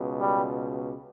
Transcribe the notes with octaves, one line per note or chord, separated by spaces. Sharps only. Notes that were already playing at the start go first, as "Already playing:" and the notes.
Already playing: C#2 B2
G3